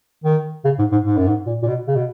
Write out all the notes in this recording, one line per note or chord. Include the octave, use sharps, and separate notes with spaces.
D#3
C#3
G#2
G#2
G#2
F#2
G#2
A#2
A#2
B2
C#3
B2